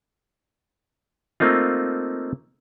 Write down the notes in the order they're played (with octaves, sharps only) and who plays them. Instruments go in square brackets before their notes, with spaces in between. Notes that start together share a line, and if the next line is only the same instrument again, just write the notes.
[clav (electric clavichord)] A3 A#3 C4 D#4 F4